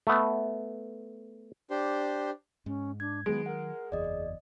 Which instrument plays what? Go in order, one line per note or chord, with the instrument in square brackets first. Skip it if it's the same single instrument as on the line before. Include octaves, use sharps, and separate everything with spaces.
[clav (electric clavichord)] A3 B3
[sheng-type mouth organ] D4 G4 C5
[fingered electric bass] G#2 [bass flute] C#4
[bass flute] D4 [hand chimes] G#6
[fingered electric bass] D#3 F#3 [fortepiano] G#3 [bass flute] B3 [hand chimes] D7
[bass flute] A#4 [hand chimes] F#5
[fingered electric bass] F#1 E2 [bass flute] G#4 [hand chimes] D5 D#5